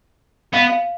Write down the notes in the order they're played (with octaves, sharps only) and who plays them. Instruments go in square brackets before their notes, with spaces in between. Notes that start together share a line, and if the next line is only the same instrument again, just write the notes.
[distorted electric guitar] B3 [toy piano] F5
[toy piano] F5